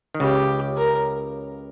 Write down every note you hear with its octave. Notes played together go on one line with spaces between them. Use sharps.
D#3
C#2 C#3 G4
A#4